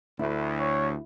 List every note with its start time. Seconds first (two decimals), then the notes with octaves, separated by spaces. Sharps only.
0.19 D2 E4
0.59 C#5